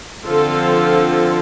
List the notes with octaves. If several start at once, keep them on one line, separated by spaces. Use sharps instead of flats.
D3 F3 C4 F4 A4